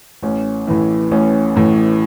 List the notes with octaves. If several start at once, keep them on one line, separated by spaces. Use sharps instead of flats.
A1 C#4
A2 E3
A1 C#4
A2 E3